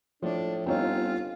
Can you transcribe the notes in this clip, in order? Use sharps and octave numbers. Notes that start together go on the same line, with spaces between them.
A2 F3 D4
G1 C4 D#4 F4 C#5